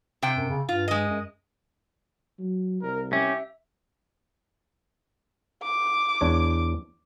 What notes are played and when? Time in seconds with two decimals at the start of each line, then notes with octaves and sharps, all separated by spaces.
0.22 C3 G5
0.37 F#2
0.49 C#3
0.69 G2 F4
0.88 G#3 D#5
1.08 F#2
2.39 F#3
2.82 C2 A#4
3.13 C#4 G4 E5
5.64 D6
6.21 E2 D4 C#5